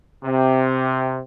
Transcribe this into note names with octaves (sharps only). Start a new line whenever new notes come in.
C3